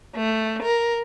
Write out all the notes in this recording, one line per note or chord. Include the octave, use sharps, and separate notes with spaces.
A3
A#4